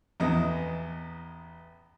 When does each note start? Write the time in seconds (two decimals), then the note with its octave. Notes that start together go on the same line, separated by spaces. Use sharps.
0.20 A1 E2 B3 D#5